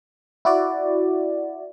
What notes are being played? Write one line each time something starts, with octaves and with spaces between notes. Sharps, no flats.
E4 F#4 D5